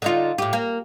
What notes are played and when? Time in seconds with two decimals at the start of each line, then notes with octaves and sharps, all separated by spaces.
0.02 D3 D#4 F4
0.38 A2 G4
0.53 A#3